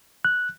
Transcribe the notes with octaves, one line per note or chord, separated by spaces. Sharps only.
F#6